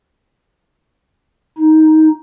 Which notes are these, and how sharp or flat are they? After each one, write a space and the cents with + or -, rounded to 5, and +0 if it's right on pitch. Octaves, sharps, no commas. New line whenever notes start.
D#4 +15